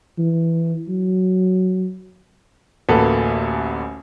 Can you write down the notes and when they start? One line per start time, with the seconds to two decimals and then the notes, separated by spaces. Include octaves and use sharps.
0.19 E3
0.88 F#3
2.89 A1 D2 A#3 A4 B4